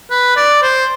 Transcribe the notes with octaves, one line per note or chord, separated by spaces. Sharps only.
B4
D5
C5